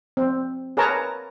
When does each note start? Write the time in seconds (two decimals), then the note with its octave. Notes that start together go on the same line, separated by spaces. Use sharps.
0.17 C4
0.77 G#4 A#4 B4 C#5 A5 A#5